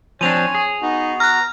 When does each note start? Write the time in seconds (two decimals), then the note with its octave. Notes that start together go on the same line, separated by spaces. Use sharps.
0.21 F3 C4 D4 C#5 G#5 D#7 F7
0.55 G#4
0.82 B3 D#4 F#4
1.20 A#5 F6 F#6